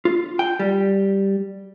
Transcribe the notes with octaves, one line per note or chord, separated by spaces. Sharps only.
F4
G5
G3